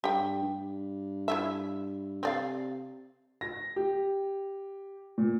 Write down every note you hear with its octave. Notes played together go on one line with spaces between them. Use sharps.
G2 G4 G5
G2
E4 F4 E5
C3 C4 D5 F5
A#6
G4
A#2